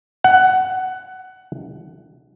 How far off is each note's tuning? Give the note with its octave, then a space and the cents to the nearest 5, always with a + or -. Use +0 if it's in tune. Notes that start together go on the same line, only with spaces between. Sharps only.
F#5 +15